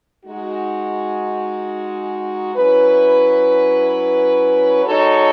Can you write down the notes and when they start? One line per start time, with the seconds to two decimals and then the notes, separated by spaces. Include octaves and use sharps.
0.25 G#3 D#4 F#4
2.55 F#3 C#4 E4 B4
4.84 G#3 D#4 F#4 A4 C#5